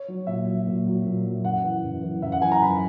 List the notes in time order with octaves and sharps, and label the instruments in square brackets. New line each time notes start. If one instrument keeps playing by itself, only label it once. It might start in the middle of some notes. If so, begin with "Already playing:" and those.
Already playing: [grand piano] C#5
F#3
A#2 E5
F#3
A#2
F#3
A#2
F#3
F#2 F#5
E3
F#2
E3
F#2 E5
F#5
E3 G#5
A#5
F#2 B5